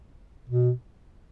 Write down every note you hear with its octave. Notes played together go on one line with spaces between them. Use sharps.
B2